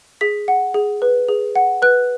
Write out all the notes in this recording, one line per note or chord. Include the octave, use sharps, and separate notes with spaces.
G#4 B6
F#5
G#4
B4
G#4
F#5
B4 F#6